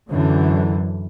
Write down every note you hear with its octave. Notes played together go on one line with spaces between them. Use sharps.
F#2 D3 E3